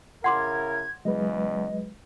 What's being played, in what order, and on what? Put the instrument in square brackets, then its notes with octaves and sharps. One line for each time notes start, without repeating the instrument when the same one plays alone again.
[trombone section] C#3 E4 A#4 [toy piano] F#5 C6 D6 [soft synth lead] G#6
[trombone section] E2 C#3 [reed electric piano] F#3 G#3 B4 [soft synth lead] D#5